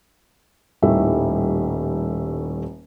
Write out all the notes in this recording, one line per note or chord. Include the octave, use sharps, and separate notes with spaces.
D#1 A2 D#3 G3 E5